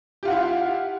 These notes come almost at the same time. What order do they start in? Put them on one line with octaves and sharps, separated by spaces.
G4 F4 F#5 E4 F5